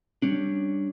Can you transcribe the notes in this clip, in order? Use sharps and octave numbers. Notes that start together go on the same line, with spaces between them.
G3 C#4 D4